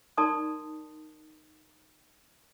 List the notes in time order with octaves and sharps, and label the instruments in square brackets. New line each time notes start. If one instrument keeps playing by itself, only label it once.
[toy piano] D#4 A#4 D5 A5 C6 D#6